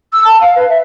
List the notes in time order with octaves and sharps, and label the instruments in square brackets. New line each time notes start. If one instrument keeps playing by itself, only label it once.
[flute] E6
A5
F5
B4
E5